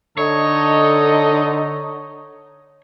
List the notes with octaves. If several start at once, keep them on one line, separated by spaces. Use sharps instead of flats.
D3 D#4 A4 C#5 D#5